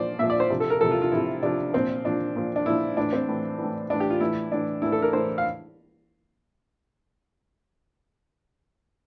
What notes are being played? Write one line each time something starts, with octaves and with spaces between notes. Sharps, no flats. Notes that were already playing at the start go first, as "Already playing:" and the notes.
Already playing: A#2 F3 C5 D5
A#2 F3 E5
D5
C5
C3 F3
A4
A#4
C3 F3 A4
F4
F4
C3 F3 E4
C3 F3 D4
A#2 F3 C4
A#2 F3 D4
A#2 F3
D4
A#2 F3 E4
A2 E3 D4
C4
A2 E3
A2 E3
A2 E3 D4
G4
F4
A2 E3 E4
A2 E3 D4
A2 E3 E4
A4
A#4
A2 E3 C5
F5